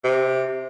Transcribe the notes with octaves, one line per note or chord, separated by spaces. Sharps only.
C3